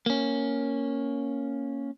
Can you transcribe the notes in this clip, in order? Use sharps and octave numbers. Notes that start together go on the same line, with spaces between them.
A#3 C#4